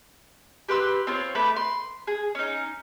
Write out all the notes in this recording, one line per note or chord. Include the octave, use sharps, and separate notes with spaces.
G4 B4 C6 E6
C4 F4 C#5
A3 B4 B5 D6
C6
G#4
C#4 D#4